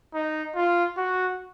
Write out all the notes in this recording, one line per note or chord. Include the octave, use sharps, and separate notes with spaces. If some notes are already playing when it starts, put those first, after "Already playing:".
D#4
F4
F#4